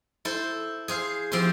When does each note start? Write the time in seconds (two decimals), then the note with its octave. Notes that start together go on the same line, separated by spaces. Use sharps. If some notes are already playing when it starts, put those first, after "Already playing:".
0.25 E4 A4 C5
0.88 G#4 C5 F5
1.32 F3 C4 E4 G4 C5